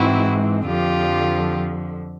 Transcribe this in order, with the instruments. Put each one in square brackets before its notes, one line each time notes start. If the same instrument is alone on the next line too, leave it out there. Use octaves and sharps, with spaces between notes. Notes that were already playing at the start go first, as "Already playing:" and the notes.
Already playing: [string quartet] G#2 E3 G#3 C4 E4 F#4
F2 D3 F3 F4 G4